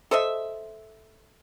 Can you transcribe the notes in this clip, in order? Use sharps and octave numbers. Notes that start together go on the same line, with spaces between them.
A4 C5 D#5 E5